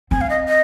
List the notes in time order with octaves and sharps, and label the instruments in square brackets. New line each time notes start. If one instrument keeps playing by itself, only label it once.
[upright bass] C4 [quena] G#5
[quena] F5
D#5
D#5